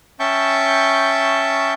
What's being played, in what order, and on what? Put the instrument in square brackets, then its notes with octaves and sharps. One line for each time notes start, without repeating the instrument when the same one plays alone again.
[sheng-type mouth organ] C#4 E5 G5 A5 C#6 G6